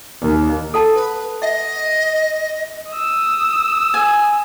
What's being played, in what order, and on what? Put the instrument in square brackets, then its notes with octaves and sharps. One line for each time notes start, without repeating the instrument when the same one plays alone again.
[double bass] D#2
[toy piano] A4 F#5 A5
[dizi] B4
[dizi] D#5 [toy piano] E5 F#5
[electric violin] D#6 E6
[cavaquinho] G#5